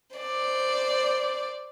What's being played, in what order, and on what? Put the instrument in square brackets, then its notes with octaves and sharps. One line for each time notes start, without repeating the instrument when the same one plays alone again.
[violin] C5 D5